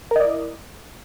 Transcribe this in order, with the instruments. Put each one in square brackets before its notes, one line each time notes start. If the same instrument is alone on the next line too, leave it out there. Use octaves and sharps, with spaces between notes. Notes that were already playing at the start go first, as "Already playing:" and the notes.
[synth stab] A#4
D#5
D5
E4